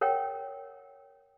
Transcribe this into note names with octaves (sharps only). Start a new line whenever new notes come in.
A#4 C#5 F#5 G5